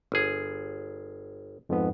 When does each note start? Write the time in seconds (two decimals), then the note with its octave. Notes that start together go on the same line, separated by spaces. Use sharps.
0.12 G1 G#4
1.69 F2 G#2 B3